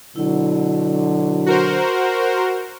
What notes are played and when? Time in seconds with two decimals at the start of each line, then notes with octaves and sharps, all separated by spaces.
0.16 B2 D3 F#3 E4
1.46 F#4 A#4 C5 F#5